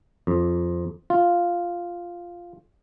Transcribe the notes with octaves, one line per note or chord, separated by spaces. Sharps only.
F2
F4